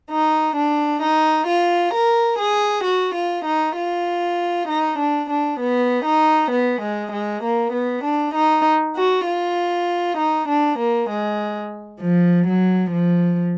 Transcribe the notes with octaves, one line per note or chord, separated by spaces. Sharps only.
D#4
D4
D#4
F4
A#4
G#4
F#4
F4
D#4
F4
D#4
D4
D4
B3
D#4
B3
G#3
G#3
A#3
B3
D4
D#4
F#4
F4
D#4
D4
A#3
G#3
F3
F#3
F3